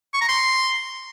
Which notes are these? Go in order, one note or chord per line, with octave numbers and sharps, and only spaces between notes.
C#6
A#5
C6